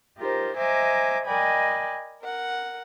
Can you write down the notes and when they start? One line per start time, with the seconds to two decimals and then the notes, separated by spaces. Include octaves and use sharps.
0.17 D#4 F4 G4 A#4 C5
0.57 C5 D#5 E5 G#5 A#5 D6
1.25 A#4 D5 D#5 G5 G#5 B5
2.22 A#4 F#5